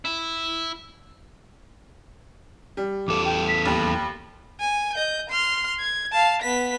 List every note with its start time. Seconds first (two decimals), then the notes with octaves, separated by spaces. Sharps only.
0.05 E4
2.77 G3
3.08 E2 A4 D6
3.25 G5
3.48 B6
3.65 D#2 B5
4.60 G#5
4.94 D#5 G6
5.30 C6 F6
5.80 G#6
6.12 F5 A5
6.42 B3 B6